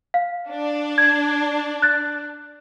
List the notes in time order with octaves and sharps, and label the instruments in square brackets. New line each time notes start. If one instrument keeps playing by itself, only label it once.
[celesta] F5
[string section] D4
[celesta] G#6
F#6 A6